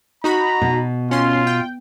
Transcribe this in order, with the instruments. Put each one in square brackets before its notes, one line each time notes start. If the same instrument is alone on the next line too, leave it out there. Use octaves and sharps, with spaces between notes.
[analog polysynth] D#4 F#4 B5 [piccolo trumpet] A#5
[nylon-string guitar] B2
[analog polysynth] C#4 C6 [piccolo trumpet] F4
[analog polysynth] G5